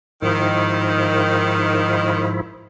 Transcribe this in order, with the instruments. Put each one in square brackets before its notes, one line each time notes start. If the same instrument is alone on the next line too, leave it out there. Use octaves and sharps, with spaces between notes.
[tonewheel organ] G#2 F3 E4 [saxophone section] D#3